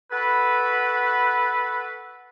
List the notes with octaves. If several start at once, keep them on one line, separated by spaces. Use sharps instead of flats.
F#4 A4 B4